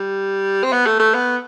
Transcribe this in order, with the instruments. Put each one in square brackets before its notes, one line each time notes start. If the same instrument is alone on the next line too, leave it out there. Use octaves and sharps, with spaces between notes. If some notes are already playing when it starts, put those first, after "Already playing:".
Already playing: [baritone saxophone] G3
C4
B3
A3
A3
B3